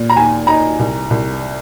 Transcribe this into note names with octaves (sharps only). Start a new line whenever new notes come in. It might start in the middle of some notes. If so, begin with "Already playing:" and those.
Already playing: A#2
A#5
D#2 G#5
D#4 A#5
C2
C2